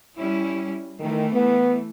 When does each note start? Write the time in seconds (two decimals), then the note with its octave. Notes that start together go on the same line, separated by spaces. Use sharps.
0.17 G3 C#4 E4
1.00 D#3 E3 A3
1.32 B3